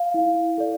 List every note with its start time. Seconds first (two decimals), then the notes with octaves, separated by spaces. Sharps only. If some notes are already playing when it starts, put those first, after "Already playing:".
Already playing: F5
0.14 E4
0.58 A4 D5